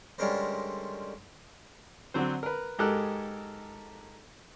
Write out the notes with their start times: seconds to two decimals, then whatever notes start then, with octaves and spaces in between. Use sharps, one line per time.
0.18 D3 G3 G#3 C#4 A#4 C5
2.14 D3 F#3 C4 C5
2.43 A#4 B4
2.79 G#2 G#3 G4 A4 A#4 F#6